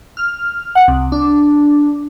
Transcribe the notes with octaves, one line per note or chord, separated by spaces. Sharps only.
F6
F#5
C2
D4